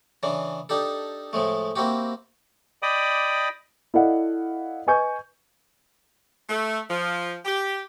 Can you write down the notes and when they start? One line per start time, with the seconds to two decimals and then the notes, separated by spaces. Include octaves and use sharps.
0.23 C#3 E3 D4
0.69 D4 D#4 G4 A4
1.33 A2 F3 G#3 A3
1.76 A#3 C4 E4 F#4 G4
2.82 D5 D#5 G5 B5 D6 D#6
3.94 E4 A4 D5 D#5 F5 F#5
4.87 B4 D#5 G#5 C#6 G6
6.49 A3
6.90 F3
7.44 G4